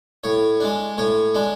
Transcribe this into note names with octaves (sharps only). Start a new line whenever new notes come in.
A2 C#5
G#3 D4
A2 C#5
G#3 D4